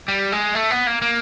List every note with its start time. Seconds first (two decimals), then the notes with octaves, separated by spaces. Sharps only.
0.08 G3
0.32 G#3
0.55 A3
0.71 B3
0.87 A#3
1.02 A#3